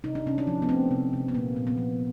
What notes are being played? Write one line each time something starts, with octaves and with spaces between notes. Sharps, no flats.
C3 D#4
D4
C3 C#4
D4
F3
B3
A3 C4
C3
C3
B3
A#2 A#3
A#2
B3
F3